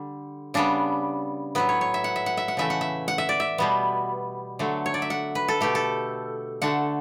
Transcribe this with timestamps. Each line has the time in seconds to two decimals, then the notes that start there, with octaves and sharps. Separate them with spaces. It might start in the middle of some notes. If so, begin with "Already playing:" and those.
Already playing: D3 G3
0.54 C#3 G3 B3 D4
1.55 A2 F#3 B3 B4
1.69 C#5
1.81 C#5
1.94 E5
2.04 F#5
2.16 E5
2.26 F#5
2.37 E5
2.48 F#5
2.57 C#3 E3 A3 E5
2.70 F#5
2.81 E5
3.08 F#5
3.18 E5
3.29 D5
3.40 E5
3.58 B2 G3 B3
4.59 D3 F#3 A3
4.86 C#5
4.94 D5
5.02 E5
5.10 F#5
5.35 B4
5.48 A4
5.61 B2 A3 G4
5.75 A4
6.62 D3 A3 F#5